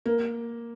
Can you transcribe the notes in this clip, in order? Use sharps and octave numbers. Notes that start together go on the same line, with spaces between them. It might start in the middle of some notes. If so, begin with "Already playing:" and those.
A#3